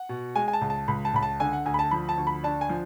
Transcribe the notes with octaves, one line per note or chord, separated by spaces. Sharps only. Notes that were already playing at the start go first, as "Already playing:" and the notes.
Already playing: F#5
B2
G#3 G#5
G#5
A5
C#2
A5
C#2 B5
A5
C#2 B5
A5
D3 G#5
F#5
D2 G#5
B5
A5
F3 B5
A5
D2
B5
D4 A5
G#5
F3